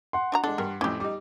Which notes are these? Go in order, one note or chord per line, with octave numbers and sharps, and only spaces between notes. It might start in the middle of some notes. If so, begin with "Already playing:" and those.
F#5 C6
D4 F#4 A#5
G#3 D4 A4
G2 A#4
F2 A2 C#4 G4 D6
G3 D#4 D6